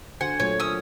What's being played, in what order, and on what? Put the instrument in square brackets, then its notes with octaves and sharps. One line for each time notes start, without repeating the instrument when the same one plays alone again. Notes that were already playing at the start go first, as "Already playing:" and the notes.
[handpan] D3 F#4 C5 [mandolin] F#5 [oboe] G#5
[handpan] A#2 F#3 A3 [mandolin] C#5
[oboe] C#4 [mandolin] D#6 E6